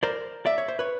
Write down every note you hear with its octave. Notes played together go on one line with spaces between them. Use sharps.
A#4 C5 D5
D5 E5
C#5
C5
B4 C#5